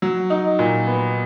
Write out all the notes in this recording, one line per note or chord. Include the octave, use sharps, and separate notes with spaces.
F#3
D#4
A#2
B3